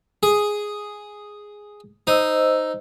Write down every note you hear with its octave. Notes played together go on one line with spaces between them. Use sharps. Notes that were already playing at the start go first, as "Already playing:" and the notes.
G#4
D#4 C5 D#5 E6